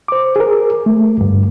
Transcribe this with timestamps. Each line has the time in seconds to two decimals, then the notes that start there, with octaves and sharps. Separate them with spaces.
0.08 C5 D6
0.36 G#4 A#4
0.86 A3
1.18 D2 G2